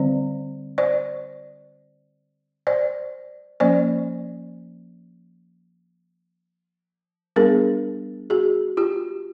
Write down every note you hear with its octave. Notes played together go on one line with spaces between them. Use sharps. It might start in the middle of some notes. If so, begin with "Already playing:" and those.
Already playing: D3 G3 C4 C5 D5
C5 D5
C5 D5
F3 A#3 C#4 C5 D5
G3 B3 D4 G#4 A#4
F#4 G#4
F4 G4